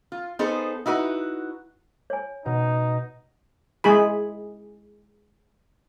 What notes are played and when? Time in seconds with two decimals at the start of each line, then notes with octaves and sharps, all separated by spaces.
0.12 F4
0.39 B3 D#4 G#4 A4 C5
0.86 D#4 E4 F#4 B4
2.10 C#5 G#5
2.46 B2 D#4
3.84 G#3 E4 G#4 B5